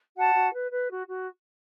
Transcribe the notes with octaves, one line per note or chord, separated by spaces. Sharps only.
F#4 F#5 A5
F#4
B4
B4
F#4
F#4